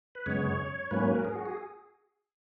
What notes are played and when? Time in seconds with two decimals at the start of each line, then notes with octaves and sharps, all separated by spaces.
0.15 B4
0.26 F#2 C#3 G#3 B3 C#5
0.91 G#2 F#3 A#3 C#4 B4
0.99 C#5
1.08 B4
1.16 A#4
1.25 G#4
1.35 F#4
1.45 G#4